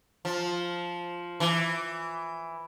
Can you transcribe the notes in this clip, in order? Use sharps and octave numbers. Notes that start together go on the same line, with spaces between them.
F3
E3